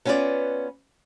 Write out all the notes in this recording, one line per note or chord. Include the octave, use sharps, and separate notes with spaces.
B3 C#4 F4 A#4 B4 D5